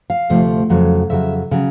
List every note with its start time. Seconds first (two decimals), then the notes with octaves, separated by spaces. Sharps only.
0.10 F5
0.30 D2 C3 F3 A3
0.70 F2 C#3 F#3
1.09 F2 C#3 F#3 E5
1.51 C#3 F#3